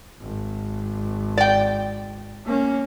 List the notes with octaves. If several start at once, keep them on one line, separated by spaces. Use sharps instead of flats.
G#1
D5 G5
A#3 C#4